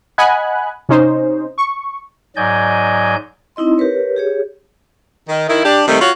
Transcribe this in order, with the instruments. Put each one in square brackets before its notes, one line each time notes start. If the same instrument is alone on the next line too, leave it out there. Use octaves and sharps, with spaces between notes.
[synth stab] D#5 F#5 G#5 B5 F#6
C3 C#4 D#4 C5
C#6
[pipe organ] G#2 F#3 D5 D#5 G#5 G6
[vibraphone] C4 D#4 E4 D#5 C6
G4 A#4 B4 C#5
G4 G#4 C#5
[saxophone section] D#3
D#3 E4
D4 G4
C3 D#3 G3 A3
F4 F#4 C#5